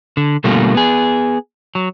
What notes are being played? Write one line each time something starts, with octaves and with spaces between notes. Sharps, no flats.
D3
B2 D3 G3 A3 A#3 F4
B3 G#4
F#3